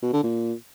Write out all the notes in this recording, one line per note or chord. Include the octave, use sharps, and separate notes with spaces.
B2
D3
A#2